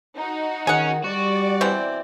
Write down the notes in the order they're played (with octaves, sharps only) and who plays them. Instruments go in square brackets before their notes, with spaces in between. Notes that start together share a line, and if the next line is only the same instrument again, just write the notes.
[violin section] D#4 F#4
[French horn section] D#3 [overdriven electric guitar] C#4 [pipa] G#4 F#5
[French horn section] G3 [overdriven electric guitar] F#4 [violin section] D5
[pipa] B2 E3 C4